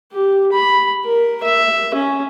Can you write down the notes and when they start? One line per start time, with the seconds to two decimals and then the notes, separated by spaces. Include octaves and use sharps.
0.13 G4
0.52 B5
1.05 A#4
1.43 E5
1.94 C#4